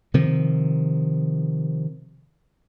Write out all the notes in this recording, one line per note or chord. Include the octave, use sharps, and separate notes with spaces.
C3 D#3 F3